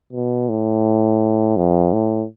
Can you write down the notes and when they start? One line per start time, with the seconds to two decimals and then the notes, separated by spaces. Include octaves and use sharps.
0.13 B2
0.49 A2
1.57 F2
1.93 A2